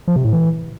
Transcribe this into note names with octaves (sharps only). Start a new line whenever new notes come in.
F3
C3
A2
E3